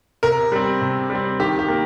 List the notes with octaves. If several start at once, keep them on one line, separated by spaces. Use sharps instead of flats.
C3 A#4
G3 C4
C3
G3
C4
D#3 G4
G4
A#3